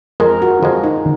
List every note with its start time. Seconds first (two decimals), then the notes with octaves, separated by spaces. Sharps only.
0.20 F2 F3 G#3 A#4
0.42 F#4
0.63 F2 F3 G#3
0.84 D#4